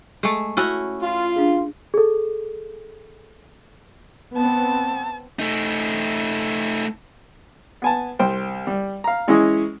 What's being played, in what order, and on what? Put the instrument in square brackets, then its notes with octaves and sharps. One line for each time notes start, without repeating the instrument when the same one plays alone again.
[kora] G#3 A3
C#4 E4 F#4
[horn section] F4
[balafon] D4 G#4
[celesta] G#4 A4
[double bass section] B3 C4 [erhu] A5
[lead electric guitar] A3 D#4
[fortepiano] B3 G#5 A5
C2 C5 G5
G3
F5 A#5
E3 G#3 C#4 E4 G#4 D#5